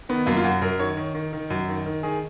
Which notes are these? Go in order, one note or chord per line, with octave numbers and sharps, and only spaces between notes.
D#3 B3
F#2 A#3
F4
F#2 F#4
F#2 A#4
D#3 C#5
D#3
D#3
D#3
F#2
D#3
D#3
D#3 G#4